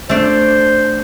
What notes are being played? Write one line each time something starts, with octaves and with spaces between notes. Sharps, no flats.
A3 D4 C5